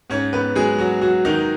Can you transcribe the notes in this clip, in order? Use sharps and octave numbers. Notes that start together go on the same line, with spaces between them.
G#2 C#4 C#5
G#2 B3 B4
F#3 G#3 G#4
F#3 F#4
F#3 F#4
D#3 F#3 D#4